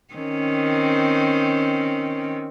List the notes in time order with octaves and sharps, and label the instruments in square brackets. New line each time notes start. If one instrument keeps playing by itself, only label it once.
[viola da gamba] D#3 C4 C#4